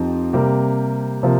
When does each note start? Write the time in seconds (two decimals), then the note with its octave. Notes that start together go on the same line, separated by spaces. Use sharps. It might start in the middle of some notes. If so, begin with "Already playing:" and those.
Already playing: F2 F3 C4 D#4 G4
0.33 C3 G3 A#3 G4
1.23 C3 F3 A#3